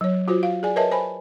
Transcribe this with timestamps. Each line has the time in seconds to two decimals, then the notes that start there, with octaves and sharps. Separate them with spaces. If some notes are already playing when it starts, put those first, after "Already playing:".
0.01 F#3 C#5
0.28 F4 F#4 C5
0.43 F5
0.63 G#4 D5 G#5
0.76 A#4 B4 C#5 D#5 E5 A5
0.92 C5 G#5 B5